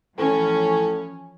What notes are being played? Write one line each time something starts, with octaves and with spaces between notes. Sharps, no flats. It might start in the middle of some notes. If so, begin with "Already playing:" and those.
A2 E3 F3 C#4